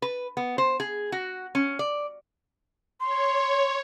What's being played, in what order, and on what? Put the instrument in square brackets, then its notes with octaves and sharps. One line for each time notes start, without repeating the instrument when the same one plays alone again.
[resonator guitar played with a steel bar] B4
B3
C5
G#4
F#4
C#4
D5
[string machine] C#5 [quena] C6